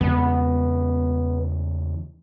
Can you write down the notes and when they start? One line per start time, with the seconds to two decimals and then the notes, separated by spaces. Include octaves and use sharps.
0.01 E2 C#3 G#3 B3